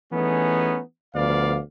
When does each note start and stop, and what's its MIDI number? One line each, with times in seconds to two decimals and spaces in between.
0.13 0.80 52
0.13 0.80 57
0.13 0.80 59
0.13 0.80 61
0.13 0.80 63
0.13 0.80 68
1.14 1.58 38
1.14 1.58 53
1.14 1.58 59
1.14 1.58 74
1.14 1.58 77